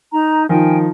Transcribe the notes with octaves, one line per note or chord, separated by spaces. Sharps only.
D#4 A#5
D#3 F3 G5 G#5